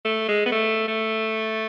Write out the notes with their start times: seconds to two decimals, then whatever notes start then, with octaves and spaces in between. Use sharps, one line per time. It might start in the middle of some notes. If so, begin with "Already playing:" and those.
0.05 A3
0.28 G#3
0.46 B3
0.52 A3
0.88 A3